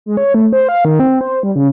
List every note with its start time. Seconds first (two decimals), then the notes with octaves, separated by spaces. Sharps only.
0.06 G#3
0.17 C#5
0.34 A3
0.53 C5
0.69 F5
0.85 D#3
1.00 C4
1.21 C5
1.43 G3
1.56 C#3